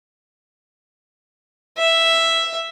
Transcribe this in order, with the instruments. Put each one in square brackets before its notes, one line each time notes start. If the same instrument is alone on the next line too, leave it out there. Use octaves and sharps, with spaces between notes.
[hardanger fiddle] E5